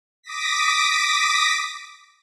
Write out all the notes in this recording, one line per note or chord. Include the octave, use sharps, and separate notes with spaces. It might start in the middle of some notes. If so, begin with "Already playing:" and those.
D6 D#6 A#6 B6